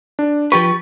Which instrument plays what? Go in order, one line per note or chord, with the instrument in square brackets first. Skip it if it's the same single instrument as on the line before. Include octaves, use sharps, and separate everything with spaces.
[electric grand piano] D4
[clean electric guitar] F3 G4 B4 [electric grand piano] C#6